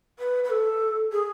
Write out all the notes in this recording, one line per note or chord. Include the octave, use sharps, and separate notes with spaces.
B4
B4
A4
G#4